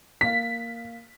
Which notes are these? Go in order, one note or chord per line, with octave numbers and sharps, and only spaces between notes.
A#3 F5 B6